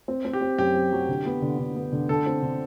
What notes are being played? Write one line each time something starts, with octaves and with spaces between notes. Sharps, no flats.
C4
C4
G4
C4
F#2 G4
C4
F#3
D3
B3
D3
D3
B3
D3
D3 A4
C4
D3